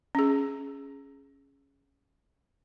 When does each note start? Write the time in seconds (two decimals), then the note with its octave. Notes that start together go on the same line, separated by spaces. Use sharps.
0.15 C#4 G#4